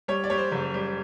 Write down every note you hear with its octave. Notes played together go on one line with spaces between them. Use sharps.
G3 C#5
D5
G3 C#5
C5
F#1
G3